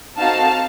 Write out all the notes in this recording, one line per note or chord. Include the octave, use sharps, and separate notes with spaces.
C4 D#4 F#4 A4 F5 A5